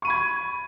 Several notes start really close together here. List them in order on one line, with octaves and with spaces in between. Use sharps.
C#6 D#7 B5 G#6